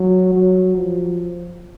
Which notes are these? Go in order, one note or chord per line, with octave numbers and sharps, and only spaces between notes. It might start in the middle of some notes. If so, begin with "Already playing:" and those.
Already playing: F#3
F#3
F3